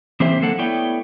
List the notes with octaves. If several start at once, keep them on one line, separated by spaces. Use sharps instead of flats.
E3 A#3 C4 G#4 C5 E5
D3 F#3 A#3 A4 F#5
A3 B3 E4 C#5 D5 G5